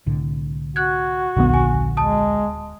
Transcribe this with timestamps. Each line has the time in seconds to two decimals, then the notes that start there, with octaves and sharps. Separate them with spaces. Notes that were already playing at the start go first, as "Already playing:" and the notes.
0.06 C2 A2 D3
0.76 F#4 F#6 G#6
1.37 D1 A#1 D#2 D3 B3
1.54 G#5
1.97 G#3 A5 D#6